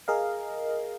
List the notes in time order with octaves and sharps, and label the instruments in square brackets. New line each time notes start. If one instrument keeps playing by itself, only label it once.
[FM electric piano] G#4 A#4 D#5 F5